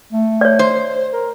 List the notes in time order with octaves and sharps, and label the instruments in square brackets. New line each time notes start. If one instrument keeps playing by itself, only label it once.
[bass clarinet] A3
[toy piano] C#5 D5
[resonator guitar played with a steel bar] C5
[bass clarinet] A#4